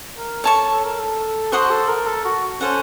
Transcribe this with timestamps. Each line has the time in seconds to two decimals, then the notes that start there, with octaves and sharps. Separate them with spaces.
0.17 A#4
0.44 A4 C#5 A5 C#6
0.72 A4
0.85 A#4
0.98 A4
1.52 F#4 C5 F#5 C6 D#6
1.70 A4
1.88 A#4
2.07 A4
2.25 F#4
2.61 C#4 A4 C5 F#5